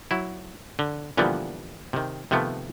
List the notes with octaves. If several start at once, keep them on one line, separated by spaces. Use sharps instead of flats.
F#3 E4
D3
A#2 D3 E3 F3 G3 B3
C3 D#3
C3 D#3 F3 A3 B3